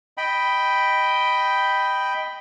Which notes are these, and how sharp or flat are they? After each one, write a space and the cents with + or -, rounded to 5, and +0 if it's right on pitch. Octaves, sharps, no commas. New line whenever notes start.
D#5 +0 G5 +0 B5 +0